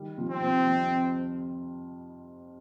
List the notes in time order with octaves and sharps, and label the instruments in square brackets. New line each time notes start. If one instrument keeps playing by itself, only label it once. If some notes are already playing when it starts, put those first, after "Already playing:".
Already playing: [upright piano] D#3 G3
C3 F3
[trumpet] C4
[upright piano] C3 F3
F2